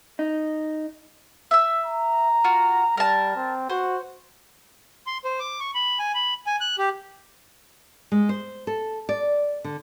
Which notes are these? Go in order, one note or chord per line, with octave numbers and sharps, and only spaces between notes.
D#4
E5 E6
A#5
F4 F#4
G3 A#4 A5
C4
F#4 C5
C6
C5
D6
C#6
B5
G#5
B5
G#5
F#6
G4
G#3
C5
A4
D5
D3